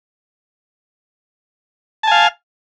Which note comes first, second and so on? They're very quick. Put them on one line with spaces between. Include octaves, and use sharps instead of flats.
A5 G#5 F5